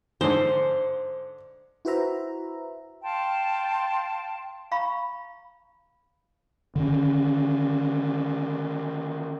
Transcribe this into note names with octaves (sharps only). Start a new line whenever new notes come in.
G#2 D3 C5
E4 F#4 B4 C5 E5 A#5
F5 G5 A5 C6
F5 A#5 B5 C#6
D3 D#3 C#4